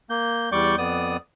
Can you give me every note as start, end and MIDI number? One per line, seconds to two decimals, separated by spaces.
0.10 0.50 58
0.10 0.50 91
0.52 0.76 40
0.52 0.76 55
0.52 0.76 74
0.52 0.76 85
0.52 0.76 86
0.52 0.76 91
0.78 1.17 41
0.78 1.17 59
0.78 1.17 74
0.78 1.17 87